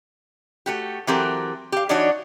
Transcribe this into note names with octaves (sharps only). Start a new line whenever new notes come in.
A3 F#4 G4
E3 F#3 C4 G4 A4 A#4
G4 F5
E3 D4 D#4 F#4 C#5